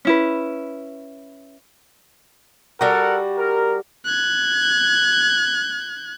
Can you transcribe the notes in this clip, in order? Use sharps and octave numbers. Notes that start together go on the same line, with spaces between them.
C#4 E4 B4
G3 F#4 A4 A#4 F#5
A#4
F#6 G#6